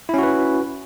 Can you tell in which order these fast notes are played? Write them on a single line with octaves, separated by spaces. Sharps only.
E4 C#4 F#4 B4